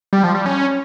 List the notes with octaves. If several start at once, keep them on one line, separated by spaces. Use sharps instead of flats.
G3
F3
G3
C#4